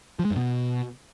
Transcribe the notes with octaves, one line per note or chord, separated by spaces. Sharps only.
F3
G#3
F#2
B2